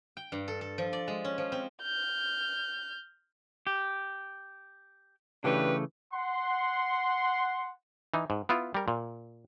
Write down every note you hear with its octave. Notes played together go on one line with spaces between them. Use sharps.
G5
G2
A4
A4
F3
D5
G#3
C#4
F3
C4
F6 G6
G4
C#3 E3 A3 D4 G4 B4
F#5 C6
E3 D#4
G#2
B3 E4 F4
G3 A#4
A#2